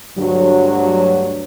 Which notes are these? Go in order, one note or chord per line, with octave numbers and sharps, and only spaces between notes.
D2 G2 D3 F#3